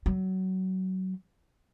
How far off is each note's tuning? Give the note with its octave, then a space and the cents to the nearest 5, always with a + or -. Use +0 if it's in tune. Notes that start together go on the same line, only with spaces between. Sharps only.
F#3 +20